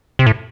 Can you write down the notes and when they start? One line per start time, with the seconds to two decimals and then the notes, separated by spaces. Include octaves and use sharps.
0.19 C3
0.26 A2